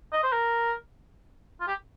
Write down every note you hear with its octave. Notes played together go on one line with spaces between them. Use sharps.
D#5
C5
A#4
F4
G4